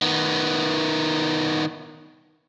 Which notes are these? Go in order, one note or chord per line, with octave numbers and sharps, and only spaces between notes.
D#3 B3